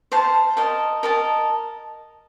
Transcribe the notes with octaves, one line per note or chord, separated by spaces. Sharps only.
C5 F5 A5
A#4 D#5 A5
A#4 D#5 A5